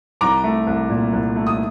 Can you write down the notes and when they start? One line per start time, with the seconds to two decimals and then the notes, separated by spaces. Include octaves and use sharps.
0.21 C2 A#5 D6
0.44 A3
0.67 C2
0.90 A#2
1.13 C2
1.36 A3
1.47 D#6